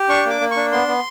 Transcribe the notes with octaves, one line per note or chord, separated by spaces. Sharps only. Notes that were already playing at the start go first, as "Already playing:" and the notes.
Already playing: G4
D4 C#6
A#3 D6
A#3
C#6
D4
B3 C6
B3